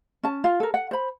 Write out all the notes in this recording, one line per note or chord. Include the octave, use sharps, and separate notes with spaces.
C#4 A5
F4
A4 A#4
F#5
C5 B5